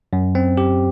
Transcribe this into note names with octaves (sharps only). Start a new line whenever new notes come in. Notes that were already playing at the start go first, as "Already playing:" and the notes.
F#2
C4
G4